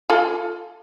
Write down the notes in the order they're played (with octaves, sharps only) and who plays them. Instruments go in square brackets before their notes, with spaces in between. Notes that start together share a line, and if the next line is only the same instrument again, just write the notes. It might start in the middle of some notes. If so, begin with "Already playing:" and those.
[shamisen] F4 A4